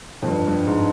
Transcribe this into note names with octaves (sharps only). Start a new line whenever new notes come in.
F2
G2
G2
G#2